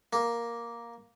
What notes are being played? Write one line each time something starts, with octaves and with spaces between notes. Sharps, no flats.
A#3